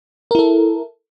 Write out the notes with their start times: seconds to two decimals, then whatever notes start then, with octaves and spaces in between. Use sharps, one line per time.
0.31 A#4
0.35 E4
0.39 A4